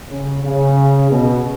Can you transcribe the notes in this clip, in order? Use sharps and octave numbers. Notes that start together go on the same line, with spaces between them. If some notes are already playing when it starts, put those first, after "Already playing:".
C#3
C#3
B2